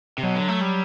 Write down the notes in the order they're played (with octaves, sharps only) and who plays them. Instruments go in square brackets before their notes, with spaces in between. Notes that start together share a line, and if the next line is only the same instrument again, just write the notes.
[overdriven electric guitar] C3
[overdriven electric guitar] B2 [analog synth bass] F#3
[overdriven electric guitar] D3
A3
G3